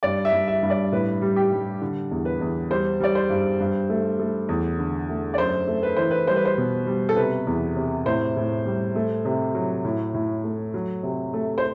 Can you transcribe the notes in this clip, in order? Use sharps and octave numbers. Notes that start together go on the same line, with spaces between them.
G2 D5
E5
G2
E5
G2
D5
A2 B4
G3
G4
G3
D3
E2
B4
E2
G3 C5
G3 D5
C5
G2
G2
A3
A3
E2
D3
A3
D5
F#2 C5
A3
B4
E3 C5
B4
G3 C5
B4
C5
B2
G3
A4
C3 B4
E2
C3
A2 C5
A2
G3
A3
C3
F#3
A2
A2
A3
F#3
C3
A3
C5